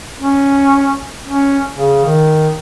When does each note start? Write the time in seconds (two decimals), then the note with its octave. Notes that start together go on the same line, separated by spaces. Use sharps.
0.21 C#4
1.27 C#4
1.74 C#3
2.05 D#3